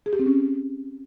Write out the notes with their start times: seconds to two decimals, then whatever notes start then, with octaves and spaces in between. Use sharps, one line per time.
0.06 G#4
0.13 G4
0.19 C4
0.26 C#4